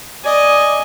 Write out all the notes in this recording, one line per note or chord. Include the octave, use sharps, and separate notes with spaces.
D5 D#5 G#5